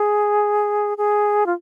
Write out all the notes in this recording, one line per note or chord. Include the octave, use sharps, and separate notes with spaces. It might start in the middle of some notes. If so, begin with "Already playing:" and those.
Already playing: G#4
G#4
F4